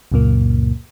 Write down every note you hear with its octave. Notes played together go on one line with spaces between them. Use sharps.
C#2 F#2 A#2 A#3